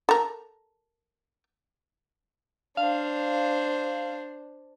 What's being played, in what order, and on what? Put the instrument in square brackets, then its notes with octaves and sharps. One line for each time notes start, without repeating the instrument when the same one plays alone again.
[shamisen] A4 A#4
[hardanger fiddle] D4 C5 [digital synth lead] F5